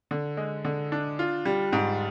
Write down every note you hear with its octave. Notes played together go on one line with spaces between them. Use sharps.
D3
G#3
D3
D4
F4
G3
G#2